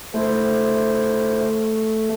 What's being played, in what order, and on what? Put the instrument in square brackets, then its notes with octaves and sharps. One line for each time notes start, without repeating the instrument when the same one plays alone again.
[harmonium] D2 E4 C5 [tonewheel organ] A3